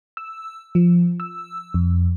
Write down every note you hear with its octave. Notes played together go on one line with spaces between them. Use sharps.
E6
F3
E6
F2